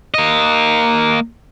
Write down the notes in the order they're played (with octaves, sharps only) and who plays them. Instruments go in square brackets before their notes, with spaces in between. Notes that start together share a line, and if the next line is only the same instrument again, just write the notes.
[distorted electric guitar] A#3 D#5